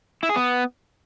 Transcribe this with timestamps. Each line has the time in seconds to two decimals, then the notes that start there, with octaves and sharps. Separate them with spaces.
0.23 E4
0.29 G#4
0.36 B3